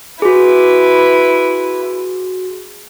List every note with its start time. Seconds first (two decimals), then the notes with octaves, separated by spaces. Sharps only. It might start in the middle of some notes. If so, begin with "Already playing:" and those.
0.22 E4 F#4 G#4 B4